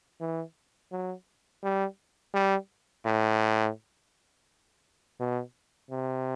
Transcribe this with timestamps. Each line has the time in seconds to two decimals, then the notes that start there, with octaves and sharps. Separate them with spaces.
0.21 E3
0.92 F#3
1.64 G3
2.34 G3
3.06 A2
5.20 B2
5.91 C3